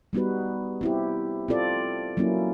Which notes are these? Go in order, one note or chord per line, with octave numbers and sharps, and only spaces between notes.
G3 B3 D#4 F#4 B4
C4 E4 G4
C4 F4 A4 D5
F#3 A#3 C#4 E4